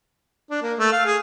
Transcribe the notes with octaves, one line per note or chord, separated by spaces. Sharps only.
D4
A#3
A3
F5
G#4